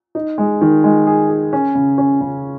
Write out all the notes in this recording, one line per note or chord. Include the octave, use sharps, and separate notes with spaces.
D#4
G#3
D#3
G#3
G#4
G#4
C#4
C#3
C#4
C#3